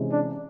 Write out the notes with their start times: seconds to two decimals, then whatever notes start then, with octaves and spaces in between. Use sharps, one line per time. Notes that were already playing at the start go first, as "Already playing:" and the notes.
Already playing: C3 E3 G#3 C#4
0.12 D4